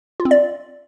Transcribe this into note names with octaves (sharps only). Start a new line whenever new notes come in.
F4
C4
D5